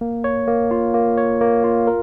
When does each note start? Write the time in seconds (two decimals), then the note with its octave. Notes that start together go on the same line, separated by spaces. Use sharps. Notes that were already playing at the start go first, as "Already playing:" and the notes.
0.01 A#3
0.24 C#5
0.47 A#3
0.71 F4
0.94 A#3
1.17 C#5
1.41 A#3
1.64 F4
1.87 A#4